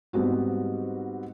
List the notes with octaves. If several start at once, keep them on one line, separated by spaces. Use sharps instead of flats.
G#2 G3 B3 C4 F#4